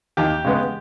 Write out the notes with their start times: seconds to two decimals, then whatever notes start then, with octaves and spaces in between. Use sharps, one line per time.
0.17 D#2 G4
0.45 C#3 G#3 B3